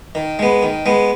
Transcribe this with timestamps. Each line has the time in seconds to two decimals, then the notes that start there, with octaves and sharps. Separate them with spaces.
0.15 D#3
0.39 G#3 B3
0.63 D#3
0.86 G#3 B3